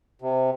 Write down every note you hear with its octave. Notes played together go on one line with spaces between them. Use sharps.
C3